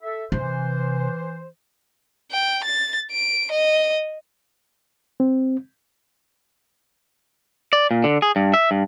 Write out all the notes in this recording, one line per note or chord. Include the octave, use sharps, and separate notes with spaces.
A4 E5
C3 E3 C5
G5
A6
D7
D#5
C4
D5
A#2
D3
G#4
G2
E5
G2